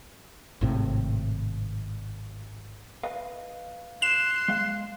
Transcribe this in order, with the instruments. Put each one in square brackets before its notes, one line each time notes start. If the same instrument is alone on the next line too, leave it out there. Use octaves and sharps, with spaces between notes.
[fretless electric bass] G#1 A2 C3
[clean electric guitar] B4 D#5 F5
[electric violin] C6 [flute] F#6 [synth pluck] E7
[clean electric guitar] G#3 F5